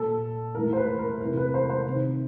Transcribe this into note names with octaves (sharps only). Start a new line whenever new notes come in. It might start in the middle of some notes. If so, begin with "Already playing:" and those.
Already playing: A#2 A4
A2 E3 A#4
C5
B4
A#4
C3 E3 A#4
B4
C5
C5
C3 D#3